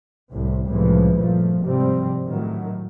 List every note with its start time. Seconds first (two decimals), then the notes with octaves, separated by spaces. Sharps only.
0.30 C2 A2 C3
0.67 C2 A2 C#3 E3 F3 G#3
1.15 G1 A#2 F3 A3
1.62 G#2 C3 F3 G3 C4
2.27 A2 D#3 F#3